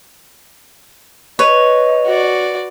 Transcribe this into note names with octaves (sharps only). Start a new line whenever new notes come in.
B4 C#5 D#5
F#4 D5